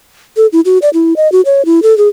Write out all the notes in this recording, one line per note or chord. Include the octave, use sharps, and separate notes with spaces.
A4
E4
F#4
D5
E4
D#5
F#4
C#5
E4
A4
G#4